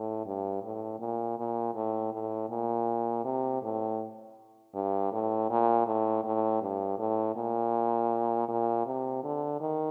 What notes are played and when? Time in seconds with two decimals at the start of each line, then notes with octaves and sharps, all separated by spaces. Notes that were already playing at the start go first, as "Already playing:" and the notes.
Already playing: A2
0.26 G2
0.63 A2
1.00 A#2
1.38 A#2
1.75 A2
2.13 A2
2.50 A#2
3.24 C3
3.63 A2
4.74 G2
5.12 A2
5.50 A#2
5.87 A2
6.24 A2
6.62 G2
6.99 A2
7.36 A#2
8.48 A#2
8.86 C3
9.24 D3
9.61 D#3